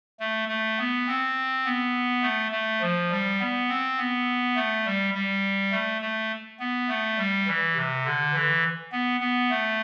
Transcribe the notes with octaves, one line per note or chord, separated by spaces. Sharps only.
A3
A3
B3
C4
B3
A3
A3
F3
G3
B3
C4
B3
A3
G3
G3
A3
A3
B3
A3
G3
E3
C3
D3
E3
B3
B3
A3